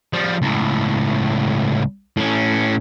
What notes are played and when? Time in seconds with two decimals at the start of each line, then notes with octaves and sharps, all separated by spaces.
0.13 F3 G3
0.42 C#2 A2
2.17 A2 C#4